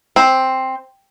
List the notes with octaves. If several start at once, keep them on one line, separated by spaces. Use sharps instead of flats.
C4